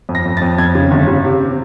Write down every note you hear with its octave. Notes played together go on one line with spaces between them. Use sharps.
F2
A#6
F2
F2 A6
F2 G#6
C#3
G1
C#3
C3
C3